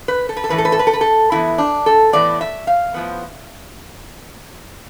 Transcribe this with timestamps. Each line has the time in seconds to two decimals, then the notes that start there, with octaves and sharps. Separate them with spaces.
0.08 B4
0.29 A4
0.37 B4
0.44 A4
0.49 A2 E3 B3 B4
0.58 A4
0.65 B4
0.72 A4
0.79 B4
0.87 A4
0.93 B4
1.01 A4
1.32 A2 E3 B3 E4
1.58 D4
1.86 A4
2.13 A2 E3 B3 D5
2.41 E5
2.67 F5
2.94 A2 F3 B3